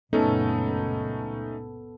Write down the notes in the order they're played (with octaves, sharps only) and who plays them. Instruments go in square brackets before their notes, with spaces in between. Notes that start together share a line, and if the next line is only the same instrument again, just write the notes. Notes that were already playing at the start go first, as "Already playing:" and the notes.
[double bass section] C#2 F#2 A#2 [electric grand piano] A3 C#4 D#4 [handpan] B3 A4